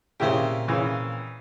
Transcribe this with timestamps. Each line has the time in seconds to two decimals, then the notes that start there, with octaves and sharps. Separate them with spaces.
0.20 A#2 C#3 C4 E4 G4
0.68 C#3 E3